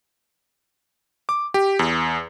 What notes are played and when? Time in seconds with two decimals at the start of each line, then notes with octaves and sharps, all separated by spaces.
1.29 D6
1.54 G4
1.79 E2